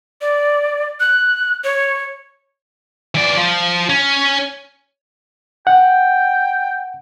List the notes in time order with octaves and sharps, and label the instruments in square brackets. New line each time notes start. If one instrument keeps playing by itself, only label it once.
[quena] D5
F#6
C#5
[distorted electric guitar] E3 D5
F3
C#4
[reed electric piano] F#5 [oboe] G5